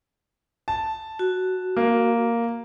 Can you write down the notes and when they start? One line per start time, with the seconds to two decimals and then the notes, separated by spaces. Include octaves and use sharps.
0.68 A5
1.19 F#4
1.77 A#3